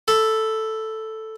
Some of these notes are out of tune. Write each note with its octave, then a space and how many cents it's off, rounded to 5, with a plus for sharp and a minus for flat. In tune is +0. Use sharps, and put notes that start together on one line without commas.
A4 +0 B5 +5